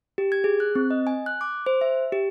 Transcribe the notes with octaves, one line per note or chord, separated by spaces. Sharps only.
G4
G#6
G#4
F#6
C4
D#5
G#5
F#6
D6
C5
E5
G4